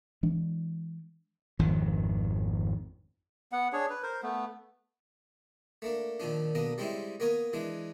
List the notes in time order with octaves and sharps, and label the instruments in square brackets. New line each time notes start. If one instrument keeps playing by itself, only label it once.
[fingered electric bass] E3 G#3 D4
[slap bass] G#1 F2 D#3
[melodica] B3 F#5
D4 G#4 C#5
B4
A#4 C5
A3 B3
[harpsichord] A3 A#3 D4
A#2 D#3 F3 C#4 D4
B1 A#3 B3 D4 D#5
G3 G#3 C4 C#4 D#4 E4
A#3 B3 A#4 C#5 D#5
E3 G#3 D4